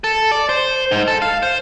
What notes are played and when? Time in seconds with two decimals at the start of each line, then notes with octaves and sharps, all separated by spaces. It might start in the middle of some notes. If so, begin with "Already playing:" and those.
0.04 A4
0.32 D5
0.49 C5
0.91 G#2
1.08 A4
1.22 F5
1.43 C5